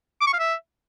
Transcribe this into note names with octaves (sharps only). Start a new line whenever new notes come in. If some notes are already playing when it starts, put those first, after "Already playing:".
D6
C#6
F5
E5